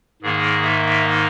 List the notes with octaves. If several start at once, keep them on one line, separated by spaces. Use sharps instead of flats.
G#2 D#3 A#3 D#4 G#4
E5